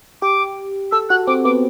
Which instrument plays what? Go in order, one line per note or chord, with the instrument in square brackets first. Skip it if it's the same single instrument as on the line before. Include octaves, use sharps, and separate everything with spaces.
[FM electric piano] G4 [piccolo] D6
[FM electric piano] A4 [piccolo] E6
[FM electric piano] F#4 [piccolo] F#6
[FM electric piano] C4 [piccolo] D6
[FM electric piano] B3 [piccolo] D6